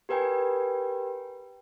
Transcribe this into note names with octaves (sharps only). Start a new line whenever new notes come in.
G4 A#4 B4 G5 G#5